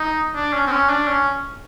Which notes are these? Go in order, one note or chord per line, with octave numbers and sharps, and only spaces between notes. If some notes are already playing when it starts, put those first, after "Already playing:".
Already playing: D#4
D4
C#4
C4
C#4
D4
C#4